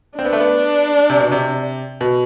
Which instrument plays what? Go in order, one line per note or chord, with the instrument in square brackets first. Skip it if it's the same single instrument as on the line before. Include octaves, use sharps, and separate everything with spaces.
[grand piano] C4 [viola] D4
[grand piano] B3
A3
B3
C3
B2
C3
B2